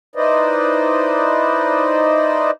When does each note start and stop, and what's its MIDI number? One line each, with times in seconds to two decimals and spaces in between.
0.16 2.51 63
0.16 2.51 64
0.16 2.51 71
0.16 2.51 72
0.16 2.51 74
0.16 2.51 75